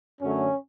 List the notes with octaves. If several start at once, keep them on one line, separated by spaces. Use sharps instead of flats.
F#2 D3 F#3 A3 C#4